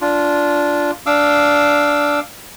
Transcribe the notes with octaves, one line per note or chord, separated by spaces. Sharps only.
D4 F4
D4 F5 D6 E6